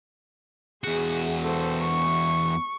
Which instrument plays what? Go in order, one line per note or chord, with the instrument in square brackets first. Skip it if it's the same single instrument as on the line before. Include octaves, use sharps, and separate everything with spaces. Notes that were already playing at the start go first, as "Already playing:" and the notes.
[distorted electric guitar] E2 F#4 [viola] G#4
[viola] A4 C5
C#6